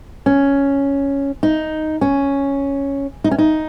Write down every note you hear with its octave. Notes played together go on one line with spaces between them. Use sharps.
C#4
D#4
C#4
D#4
C#4
D#4